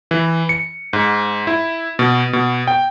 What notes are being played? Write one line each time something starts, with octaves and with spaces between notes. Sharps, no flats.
E3
C#7
G#2
E4
B2
B2
G5